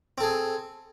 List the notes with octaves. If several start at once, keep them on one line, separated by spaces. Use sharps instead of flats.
C4 G#4 A4